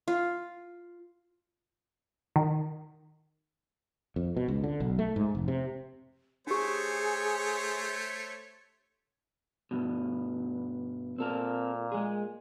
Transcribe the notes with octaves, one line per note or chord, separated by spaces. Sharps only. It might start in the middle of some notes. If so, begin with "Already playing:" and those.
F4
D#3
F2
B2
C#2
D3
B1
A3
G#2
F1
C3
A3 D4 G4 G#4 C5 C#5
G2 B2
A#2 C4 A4 A#4
G#3 G#4